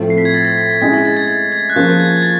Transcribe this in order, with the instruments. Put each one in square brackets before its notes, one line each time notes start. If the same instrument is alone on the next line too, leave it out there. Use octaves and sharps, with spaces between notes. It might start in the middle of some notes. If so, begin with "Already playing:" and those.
Already playing: [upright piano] A2 F3 A3 C4
[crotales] C7
B6
G#6
A6
A#6
B6
B6
[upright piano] G#3 C#4 E4 G#4 [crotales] B6
[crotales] A#6
A6
G#6
A6
G#6
F#6
[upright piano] F3 A#3 C#4 F4 G#4 [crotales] G6
[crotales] G#6
G#6
A6